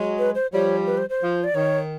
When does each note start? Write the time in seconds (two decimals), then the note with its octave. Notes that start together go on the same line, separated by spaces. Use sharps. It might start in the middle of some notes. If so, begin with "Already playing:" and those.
Already playing: F#3 G#3
0.18 B4
0.35 C5
0.52 F3 G3 C#5
0.86 B4
0.98 C5
1.10 C5
1.20 F3
1.44 D5
1.54 D#3 C#5